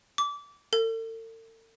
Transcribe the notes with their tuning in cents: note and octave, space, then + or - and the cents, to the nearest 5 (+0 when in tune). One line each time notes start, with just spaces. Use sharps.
D6 -25
A4 +45